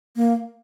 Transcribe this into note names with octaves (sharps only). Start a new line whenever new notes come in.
A#3